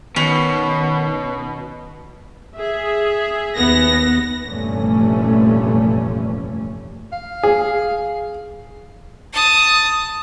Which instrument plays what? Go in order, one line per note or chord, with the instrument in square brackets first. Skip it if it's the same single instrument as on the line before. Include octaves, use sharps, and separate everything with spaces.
[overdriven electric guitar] B2 [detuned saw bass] D#3 [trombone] B3 [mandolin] C#4
[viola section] G#4 E5
[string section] D#2 B3 A#6
[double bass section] F1 G2 A#2 E3 A3 C#4
[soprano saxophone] F5
[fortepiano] G#4
[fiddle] A5 D#6